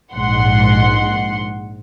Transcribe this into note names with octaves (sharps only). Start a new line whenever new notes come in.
A#1 G#2 F#5 C6